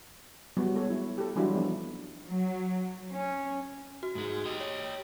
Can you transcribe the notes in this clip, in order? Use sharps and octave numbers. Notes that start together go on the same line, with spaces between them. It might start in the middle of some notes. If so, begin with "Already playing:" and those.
F#3 G3 B3 E4 F#4
G#3 A4 C#5
E4
G4 A4
E3 F#3 G3 D4 E4 F#4
F3 B3 D4 D#4
F#3
C#4
F#4
G#2 G#3
G4 D#5
C#5 G5